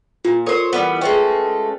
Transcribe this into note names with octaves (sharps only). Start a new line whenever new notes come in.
A#2 F4
A4 A#4 C5 C#5
E3 G3 B3
G#3 A3 C#4 B4 G5